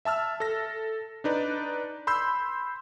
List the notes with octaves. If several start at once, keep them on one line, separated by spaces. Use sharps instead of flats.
E5 A5 E6 F6
A4 A#6
D4 D#4 B4 D5
B5 C6 E6 G6